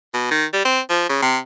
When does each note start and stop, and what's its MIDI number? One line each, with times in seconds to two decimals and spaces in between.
0.14 0.30 47
0.31 0.46 51
0.53 0.64 55
0.65 0.80 60
0.90 1.06 53
1.09 1.19 49
1.22 1.38 48